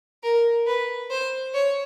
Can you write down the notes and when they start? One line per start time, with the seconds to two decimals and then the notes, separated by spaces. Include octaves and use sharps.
0.23 A#4
0.67 B4
1.11 C5
1.54 C#5